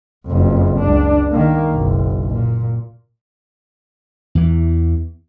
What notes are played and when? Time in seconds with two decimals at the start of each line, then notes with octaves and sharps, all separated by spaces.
0.27 F#1 F2
0.80 C#2 D4
1.32 D#3 A#3
1.73 F#1 B1
2.32 A#2
4.35 E2 E3